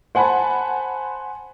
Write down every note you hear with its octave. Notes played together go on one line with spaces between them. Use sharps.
C5 F#5 G#5 A5 B5